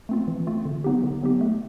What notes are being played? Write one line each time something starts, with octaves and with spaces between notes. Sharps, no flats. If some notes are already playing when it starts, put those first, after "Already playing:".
A3 C4 F4
E3
A3 C4 F4
D3
F#3 B3 D#4 G4
D3
F#3 B3 D#4 G4
A3